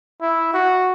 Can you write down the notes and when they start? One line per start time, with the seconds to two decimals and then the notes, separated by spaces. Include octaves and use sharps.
0.21 E4
0.54 F#4